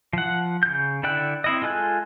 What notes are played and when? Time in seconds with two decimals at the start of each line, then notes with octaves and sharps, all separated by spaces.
0.13 F3 F#5
0.63 C#3 G6
1.03 D3 E4 D5 G5 F#6
1.44 C4 E4 D#5
1.62 G#3 F4 A4 G#5 F#6